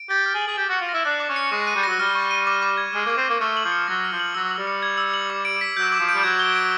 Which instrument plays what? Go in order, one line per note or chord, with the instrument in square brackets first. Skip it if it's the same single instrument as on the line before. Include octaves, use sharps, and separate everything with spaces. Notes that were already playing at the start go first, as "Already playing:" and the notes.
Already playing: [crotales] D7
[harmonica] G4 [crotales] A6
[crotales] F6
[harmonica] G#4
[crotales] F#7
[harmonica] G#4
[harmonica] G4 [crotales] D6
[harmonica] F#4 [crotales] C#7
[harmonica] F4
[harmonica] E4 [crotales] A#6
[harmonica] D4 [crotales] F#6
[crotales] D6
[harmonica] C#4
[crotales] C#7
[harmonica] G#3 [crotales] C#6
[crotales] D#7
[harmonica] G3
[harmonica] F#3 [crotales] A#6
[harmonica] G3 [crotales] F6
[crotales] C#6
D#7
D6
D6
G#6
[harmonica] G#3 [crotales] F6
[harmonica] A#3 [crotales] D6
[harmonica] C4
[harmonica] A#3 [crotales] D6
[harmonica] A3 [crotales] F6
[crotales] F#7
[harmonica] F3
[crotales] C#7
[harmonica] F#3 [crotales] A#6
[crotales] F6
[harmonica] F3
[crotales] F#7
[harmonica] F#3 [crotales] E6
[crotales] F#7
[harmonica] G3
[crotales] C#7
G#6
E6
F#7
D6
D7
B6
[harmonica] F#3 [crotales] G6
[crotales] D6
[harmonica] F3
[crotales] D7
[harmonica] G3
[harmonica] F#3 [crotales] G#6
[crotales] G7
D7